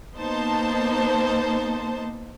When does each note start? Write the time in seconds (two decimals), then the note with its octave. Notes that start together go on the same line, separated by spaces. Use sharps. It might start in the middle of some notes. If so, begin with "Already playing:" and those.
0.16 A#3 B3 D#4 C5 A5